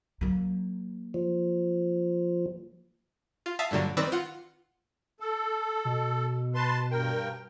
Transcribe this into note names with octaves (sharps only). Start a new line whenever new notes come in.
F#3 A#3
F3
F4
E5 F5 A5 D#6 B6 C7
G2 A#2 D3 F#3 G3
D#3 C4 B4 D5 E6 A#6
F4 F#5
A4
B2
B4 A5 C6
G2 A#4 G5